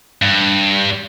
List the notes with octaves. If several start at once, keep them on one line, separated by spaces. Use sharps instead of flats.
G2